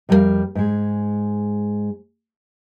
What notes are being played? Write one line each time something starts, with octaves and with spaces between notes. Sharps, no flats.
F2 G3 A3 A4 A#4 F5
G#2 G#3